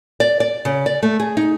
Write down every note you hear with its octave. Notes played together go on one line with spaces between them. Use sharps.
D5
D5
C#3
D5
A3
G#4
D#4